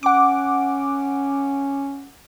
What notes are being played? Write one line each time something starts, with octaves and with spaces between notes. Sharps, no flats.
C#4 F#5 D6